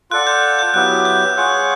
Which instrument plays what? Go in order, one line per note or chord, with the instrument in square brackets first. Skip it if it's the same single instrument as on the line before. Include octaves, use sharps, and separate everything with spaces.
[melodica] F4 A4 D5 F#5 [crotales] F#6
[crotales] G6
F#6
G6
[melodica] F#3 B3 E4 G4 [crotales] F#6
[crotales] G6
[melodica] F4 G#4 C#5 F#5 [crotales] F#6